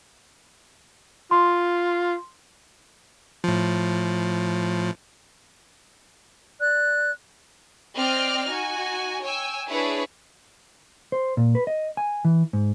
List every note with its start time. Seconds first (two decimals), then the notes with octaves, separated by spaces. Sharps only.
1.31 F4 C6
3.44 A2 F3
6.59 D5 F#6
7.96 C4 D5 D#5 G5 F6
8.49 D#4 F#4 G#5
9.22 C#5 G5 G#5 E6
9.69 D4 E4 G#4 B4 C#5
11.12 C5
11.37 A#2
11.55 B4
11.67 D#5
11.97 G#5
12.25 E3
12.53 G#2